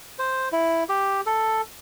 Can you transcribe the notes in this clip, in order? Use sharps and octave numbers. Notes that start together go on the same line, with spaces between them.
C5
E4
G4
A4